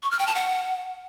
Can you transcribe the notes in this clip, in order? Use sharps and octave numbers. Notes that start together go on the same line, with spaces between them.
C#6
F6
G5
A5
F#5